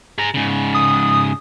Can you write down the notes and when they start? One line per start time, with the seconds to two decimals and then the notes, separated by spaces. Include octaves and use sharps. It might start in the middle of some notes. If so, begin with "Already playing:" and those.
0.18 G#4 A#5
0.34 G#2 C#3
0.74 D#6